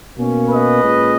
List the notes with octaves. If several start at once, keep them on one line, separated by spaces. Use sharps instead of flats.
B2 A#3 C#4
B4 D#5
A#2 G#3 C#4